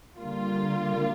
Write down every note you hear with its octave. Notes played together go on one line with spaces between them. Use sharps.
D3 G3 A#3 F4